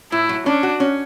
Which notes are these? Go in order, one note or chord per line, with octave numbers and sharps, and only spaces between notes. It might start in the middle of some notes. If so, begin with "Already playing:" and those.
A2 E4
F#3
C#4 D4
F#4
C#4